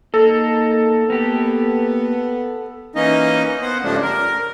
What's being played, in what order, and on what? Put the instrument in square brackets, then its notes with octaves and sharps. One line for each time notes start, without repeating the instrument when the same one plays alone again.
[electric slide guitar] A#3 [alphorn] D#4 [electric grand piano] A4
[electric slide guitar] A#3 G4 [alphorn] B3
[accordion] E3 A#3 C#4 D#4 D#5
B3 C5 F#5
G2 C#3 F3 G#3 A3 D4
A#4